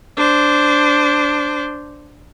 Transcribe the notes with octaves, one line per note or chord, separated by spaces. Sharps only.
D4 C5